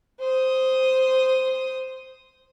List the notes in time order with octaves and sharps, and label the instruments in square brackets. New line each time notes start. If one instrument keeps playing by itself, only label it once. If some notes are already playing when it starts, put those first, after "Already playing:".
[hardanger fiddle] C5 D#6